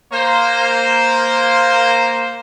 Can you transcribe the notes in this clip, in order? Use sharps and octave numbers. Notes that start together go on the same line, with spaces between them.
A#3 C5